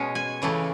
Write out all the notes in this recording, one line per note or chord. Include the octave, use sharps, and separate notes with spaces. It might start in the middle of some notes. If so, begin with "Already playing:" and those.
Already playing: B2 G#3 C#4
G#5
C#3 E3 A3